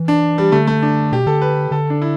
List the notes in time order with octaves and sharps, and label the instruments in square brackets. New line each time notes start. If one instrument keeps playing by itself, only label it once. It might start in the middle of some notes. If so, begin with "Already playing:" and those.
Already playing: [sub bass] E3
[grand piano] D4
G3
[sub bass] D3 [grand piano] A3
[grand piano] A3
D4
[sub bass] B2 [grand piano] G4
[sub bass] D3 [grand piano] A4
[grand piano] B4
[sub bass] D3 [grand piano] A4
[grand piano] D4
E4